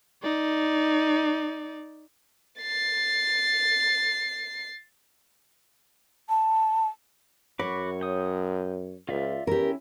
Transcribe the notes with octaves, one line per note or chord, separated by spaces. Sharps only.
D#4 D5
A6 C7
A5
F#2 F#4 C#5 B5 D6
G5 D#6
C#2 F4 D5 E5
E2 C#4 E4 G4 A#4